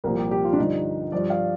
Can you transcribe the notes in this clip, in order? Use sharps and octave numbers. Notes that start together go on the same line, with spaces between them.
C2 A#2 F3 A#4
G4
G4
F4
D4
G2 D3 F3 D#4
G2 F3 D5
F5